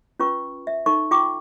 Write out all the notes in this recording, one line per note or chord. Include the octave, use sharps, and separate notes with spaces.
C#4 F4 B4 C#6
E5
D#4 A4 C#6
F4 G5 C#6 D6